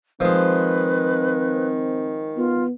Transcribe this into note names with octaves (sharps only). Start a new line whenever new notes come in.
D#3 F3 G#3 C4 B4
B3 F4